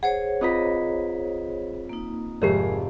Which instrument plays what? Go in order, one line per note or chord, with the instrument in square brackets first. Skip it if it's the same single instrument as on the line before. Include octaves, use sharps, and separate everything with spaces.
[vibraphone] G#4 C5 C#5 [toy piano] F#5
[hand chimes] C4 F4 B6 [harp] B4 D#5 A#5
[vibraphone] A#3 D#4
[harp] G#1 F2 C3 [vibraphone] G#3 G#4 [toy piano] G4 A#4 C#5